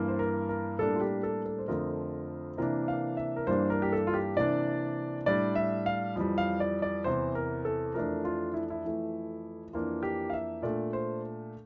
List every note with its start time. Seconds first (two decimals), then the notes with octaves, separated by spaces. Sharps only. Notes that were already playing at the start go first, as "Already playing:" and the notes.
Already playing: G2 E3 A#3
0.08 C5
0.19 A#4
0.49 A#4
0.78 A2 G3 A#3 D4 A4
0.95 F4
1.00 G4
1.23 A4
1.45 A4
1.58 C5
1.68 F2 D3 F3 A3 C4 A#4
2.57 C3 E3 A#3 D4 A#4
2.88 F5
3.17 E5
3.36 A#4
3.47 G2 E3 G3 A#3 D4 C5
3.70 A#4
3.82 G4
3.92 A4
4.07 F4
4.14 G4
4.36 C3 E3 A#3 D4 D5
5.26 A2 G3 D4 D5
5.55 E5
5.86 F5
6.16 F2 E3 G3
6.38 F5
6.60 D5
6.82 D5
7.04 E2 C3 E3 C5
7.35 A#4
7.65 A4
7.94 F2 E3 A3 D4 A#4
8.25 F4
8.54 E4
8.70 E4
8.84 F2 E3 A3
9.73 F2 E3 A#3 D4 F4
10.03 G4
10.30 F5
10.33 E5
10.62 A#2 A3 D4 D5
10.93 C5